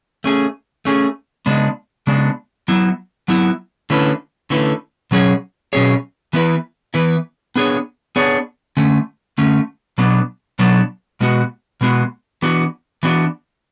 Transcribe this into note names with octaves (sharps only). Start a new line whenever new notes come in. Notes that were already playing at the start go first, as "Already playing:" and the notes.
A3 C#4 G#4
A3 C#4 G#4
C#3 G#3 B3 D4
C#3 G#3 B3 D4
F#3 B3 E4
F#3 B3 E4
D3 A3 C#4 E4 B4
D3 A3 C#4 E4 B4
B2 F#3 C#4 G#4 C#5
B2 F#3 C#4 G#4 C#5
E3 B3 E4 B4
E3 B3 E4 B4
B3 D4 G#4 C#5
B3 D4 G#4 C#5
D3 A3 C#4
D3 A3 C#4
B2 F#3 B3 D4
B2 F#3 B3 D4
B2 G#3 B3 F#4
B2 G#3 B3 F#4
E3 B3 D4 F#4
E3 B3 D4 F#4